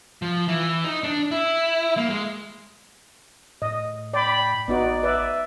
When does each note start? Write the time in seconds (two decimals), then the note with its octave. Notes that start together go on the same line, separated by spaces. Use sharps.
0.22 F3
0.48 E3
0.84 D#4
1.04 D4
1.31 E4
1.97 A#3
2.10 G#3
3.62 A2 D#5
4.14 D5 G5 B5
4.68 A1 B3 D#4 F#4 D5
5.03 B4 D5 E5